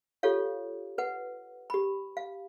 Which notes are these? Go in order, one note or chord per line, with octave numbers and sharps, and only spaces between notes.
F4 G4 A4 C#5 F5
B4 F#5
G4 B5
F5